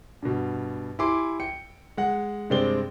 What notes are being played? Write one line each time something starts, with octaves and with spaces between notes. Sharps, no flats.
G2 B2
E4 G4 G#5 C6 D6
G5 C#7
G#3 F#5
G2 C3 G#3 C4 D5 G7